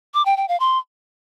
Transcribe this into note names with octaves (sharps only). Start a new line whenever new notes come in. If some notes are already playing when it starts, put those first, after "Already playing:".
D6
G5
G5
F5
C6